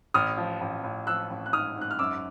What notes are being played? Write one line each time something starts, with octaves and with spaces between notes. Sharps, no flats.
A1 D#6 F6
F3
A1
A1
F3 E6 F#6
A1
F#6
G#2 D#6 F6
G#2
F#6
F6
F#2 D6 E6